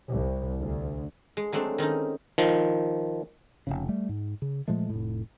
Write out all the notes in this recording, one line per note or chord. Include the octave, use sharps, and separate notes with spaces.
C2
D2
G#3
F#3 G#3 A3 C4 D4
D#3 C4 C#4 D#4
D#3 F3
F1 A#1 C#3
G3 A3
G#2
C#3
A#2 F3 G#3 A3
F1 A2